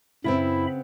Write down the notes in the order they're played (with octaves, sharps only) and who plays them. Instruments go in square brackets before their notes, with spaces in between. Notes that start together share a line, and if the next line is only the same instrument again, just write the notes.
[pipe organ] F#2 E5 B5 [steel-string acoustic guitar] C#3 B3 C4 [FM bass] E4